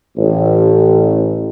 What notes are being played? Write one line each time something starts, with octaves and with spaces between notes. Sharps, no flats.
A1